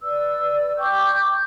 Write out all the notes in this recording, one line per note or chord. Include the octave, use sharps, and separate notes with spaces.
B4 D5 E6
G5 C#6 D6 G6